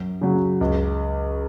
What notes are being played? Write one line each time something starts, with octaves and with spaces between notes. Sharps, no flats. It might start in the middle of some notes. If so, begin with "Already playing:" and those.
Already playing: F#2
C#3 F#3
C#2